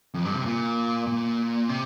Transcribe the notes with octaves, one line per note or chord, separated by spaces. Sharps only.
F2
G2
C3
A#2
A#2
C3